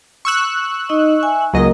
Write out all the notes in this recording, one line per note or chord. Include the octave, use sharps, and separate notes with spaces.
C#6 E6 F#6
D#4 D#5
E5 G#5
C#2 F#3 A#3 A#4 D#5